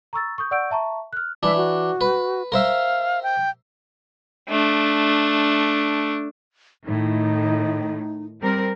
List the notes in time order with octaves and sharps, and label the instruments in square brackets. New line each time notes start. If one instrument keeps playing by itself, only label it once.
[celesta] A#5 C#6 E6 A6
C#6 D#6 G6
D5 F#5 C#6 E6 G6 D7
E5 A5 A#5 C#6
F6 F#6
[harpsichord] E3 D4 [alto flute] E5
[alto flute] F#4
[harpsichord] B4
[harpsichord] A#4 C5 E5 [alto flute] F5
[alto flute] G5
[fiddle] A3 D4
[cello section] A2 D#3 [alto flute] D#4
[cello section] G3 C4 A#4